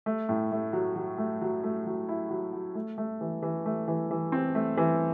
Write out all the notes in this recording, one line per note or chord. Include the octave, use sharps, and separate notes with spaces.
A3
A2
A3
F#3
F#3
A3
F#3
A3
F#3
E4
F#3
F#3
A3
A3
E3
E3
A3
E3
E3
C4
A3
E3